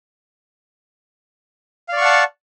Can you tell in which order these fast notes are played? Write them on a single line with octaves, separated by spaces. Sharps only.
F5 D5 C#6 F#5 A5